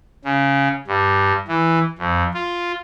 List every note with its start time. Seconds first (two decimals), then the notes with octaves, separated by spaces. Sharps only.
0.24 C#3
0.87 G2
1.48 E3
1.98 F2
2.34 F4